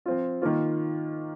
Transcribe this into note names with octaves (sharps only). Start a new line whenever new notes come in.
F3 C4 F4
D#3 A#3 F4